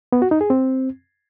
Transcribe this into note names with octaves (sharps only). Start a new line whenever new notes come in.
B3
F#4
D#4
G#4
C4